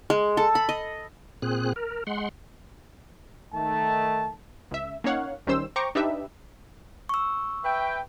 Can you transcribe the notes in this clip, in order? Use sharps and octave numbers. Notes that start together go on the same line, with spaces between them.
G#3
A4
B5
D#5
A#2 C4 G#4 F#6
A#4
G#3 F#5 C6
D#3 A3 A5
C#2 E5
A#3 C#4 D#4 C#5 F5 F#5
B1 D#3 G3 C#4 C5 E6
C5 G5 A#5 C#6 D6
D4 D#4 G4 B4 E5
C#6 E6
B4 E5 G5